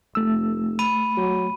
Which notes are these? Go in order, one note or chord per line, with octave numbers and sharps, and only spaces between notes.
F1 A3 E6
B5 D#7
F#3